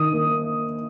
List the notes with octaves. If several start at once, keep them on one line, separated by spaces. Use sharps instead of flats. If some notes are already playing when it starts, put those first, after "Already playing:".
Already playing: D#3 D#6
A#3